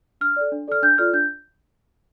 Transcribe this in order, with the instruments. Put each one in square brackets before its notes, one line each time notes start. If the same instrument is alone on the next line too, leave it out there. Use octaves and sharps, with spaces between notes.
[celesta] D4 F6
A4 D5
D4
A4 D5 F6
D4 G6
F4 A4 D5 F6
D4 G6